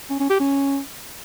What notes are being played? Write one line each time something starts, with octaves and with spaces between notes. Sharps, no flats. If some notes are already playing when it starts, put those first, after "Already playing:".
C#4
C#4
G4
C#4